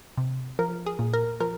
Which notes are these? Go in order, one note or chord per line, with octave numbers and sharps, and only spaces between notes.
C3
F3 A#4
G#4
A#2
A#4
F3 A#4